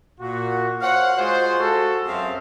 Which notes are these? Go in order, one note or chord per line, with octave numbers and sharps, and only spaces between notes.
A#2 F#4
C5 C#5 F5 F#5
G#3 F4 F#4 G#4 C5
F#4 A4
F#2 C4 G#4 C5 E5 F5